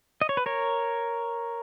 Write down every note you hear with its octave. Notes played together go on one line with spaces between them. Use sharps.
D#5
C#5
B4
A#4 C#5